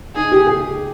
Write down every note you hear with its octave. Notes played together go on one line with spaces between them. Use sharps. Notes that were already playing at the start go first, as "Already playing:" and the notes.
D#4 G#4
G4
G#4